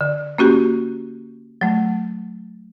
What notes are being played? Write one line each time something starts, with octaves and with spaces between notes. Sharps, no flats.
D3
A#3 C#4 F#4 G4
F#3 A3